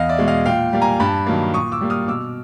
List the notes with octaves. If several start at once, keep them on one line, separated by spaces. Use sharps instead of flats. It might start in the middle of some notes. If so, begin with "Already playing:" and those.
Already playing: E2 D#5 F5
D5 E5
B2 G#3
D#5 F5
A#2 F5 G5
G3 A#3
G#5 A#5
G2 A5 B5
D#3 F#3 A#3
A#2 C#6 D#6
D6 E6
G3 A#3
D#6 F6
B2 D6 E6